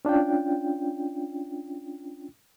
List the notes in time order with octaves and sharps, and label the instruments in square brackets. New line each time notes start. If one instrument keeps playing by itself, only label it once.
[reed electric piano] C#4 D4 F4 G5